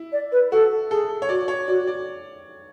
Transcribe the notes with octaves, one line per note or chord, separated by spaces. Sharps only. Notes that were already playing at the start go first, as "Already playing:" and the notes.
Already playing: E4
D5
B4
F#4 A4
G#4 A4
C#5
F#4 D5
C#5
F#4 D5
D5